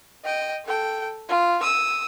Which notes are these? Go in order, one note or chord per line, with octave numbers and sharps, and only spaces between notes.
D#5 G5
A4 G5
F4
D#6 E6